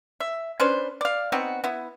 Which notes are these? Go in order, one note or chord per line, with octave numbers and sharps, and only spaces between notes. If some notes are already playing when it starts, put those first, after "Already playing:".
E5
C#4 D4 B4 C5
D5 F5
B3 C4 D#4 F#4
B3 E4